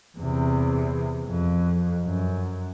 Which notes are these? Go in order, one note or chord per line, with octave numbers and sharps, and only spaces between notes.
E2 C3
F2
F#2